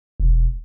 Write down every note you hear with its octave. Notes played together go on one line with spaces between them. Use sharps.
E1